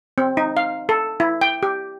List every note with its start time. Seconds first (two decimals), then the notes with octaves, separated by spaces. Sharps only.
0.18 C4
0.37 D#4
0.57 F5
0.89 A4
1.20 E4
1.41 G5
1.63 G4